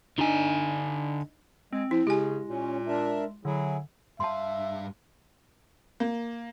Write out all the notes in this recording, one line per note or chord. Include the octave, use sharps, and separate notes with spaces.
D3 D4 D#4 G#5
G#3 C4
F3 E4
C#3 G#3 G4 G#5
A#2 C#4
D4 A#4 E5
D3 F#3 E4 G#4
G2 E5 F5 A5 C6
A#3